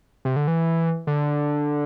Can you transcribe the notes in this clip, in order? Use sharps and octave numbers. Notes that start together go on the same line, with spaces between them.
C3
D3
E3
D3